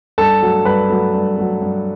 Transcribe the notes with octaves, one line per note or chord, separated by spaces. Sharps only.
G2 A4 A5
F#3 A3
G2 B4 B5
F#3 A3
G2
F#3 A3
G2